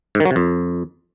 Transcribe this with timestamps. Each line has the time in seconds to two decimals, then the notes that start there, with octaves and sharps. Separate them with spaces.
0.15 G#2
0.20 D#3
0.25 F#3
0.31 C3
0.36 F2